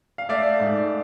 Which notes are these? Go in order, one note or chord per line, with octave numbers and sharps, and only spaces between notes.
F5
A3 D5 E5
G#2